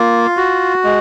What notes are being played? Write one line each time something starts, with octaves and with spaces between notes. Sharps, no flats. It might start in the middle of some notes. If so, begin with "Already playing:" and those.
Already playing: A#3 F4
F#4
G#3